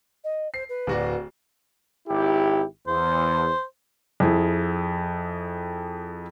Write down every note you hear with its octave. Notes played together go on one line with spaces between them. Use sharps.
D#5
C5 C7
B4
D1 F#4 D5
G#1 E4 G4
E2 C5
F2 E4 G#4